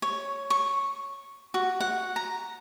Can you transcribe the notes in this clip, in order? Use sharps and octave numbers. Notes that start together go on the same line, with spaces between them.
C#5
C#6
F#4
F#5
A#5